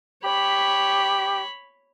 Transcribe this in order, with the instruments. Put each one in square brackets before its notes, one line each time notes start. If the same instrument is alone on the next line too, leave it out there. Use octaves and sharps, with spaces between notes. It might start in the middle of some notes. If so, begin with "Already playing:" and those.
[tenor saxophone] G4 [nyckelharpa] C#5 B5